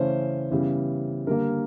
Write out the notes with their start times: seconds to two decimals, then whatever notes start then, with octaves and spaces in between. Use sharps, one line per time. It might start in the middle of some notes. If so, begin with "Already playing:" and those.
Already playing: C#3 E3 A3 C#4 C5
0.51 C#3 E3 G3 B3
1.27 D3 G3 A#3 A#4